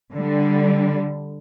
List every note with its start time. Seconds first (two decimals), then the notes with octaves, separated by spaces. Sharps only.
0.13 D3 G3